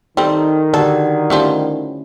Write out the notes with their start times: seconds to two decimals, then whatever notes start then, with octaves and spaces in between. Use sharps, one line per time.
0.17 D#3 G3 C4 D#4 A4
0.74 D3 F#4 G4 A4 D5 F#5
1.30 F3 G3 A3 C#4 E4